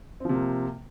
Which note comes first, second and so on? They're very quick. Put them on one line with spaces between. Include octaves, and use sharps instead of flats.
C4 F3 C3 A#3